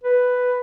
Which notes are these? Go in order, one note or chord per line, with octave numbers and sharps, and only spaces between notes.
B4